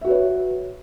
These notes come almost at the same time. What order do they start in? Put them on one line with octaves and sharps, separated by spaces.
E5 F#4 B4 C#5